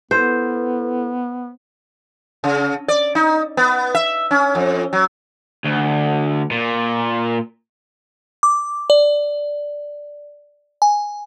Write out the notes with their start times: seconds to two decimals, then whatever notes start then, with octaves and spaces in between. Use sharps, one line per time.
0.11 B3 E4 A4 B4 C5
2.44 C#3
2.88 D5
3.15 D#4
3.57 B3
3.95 E5
4.31 C#4
4.55 F2
4.93 F#3
5.64 D2
6.51 A#2
8.43 D6
8.90 D5
10.82 G#5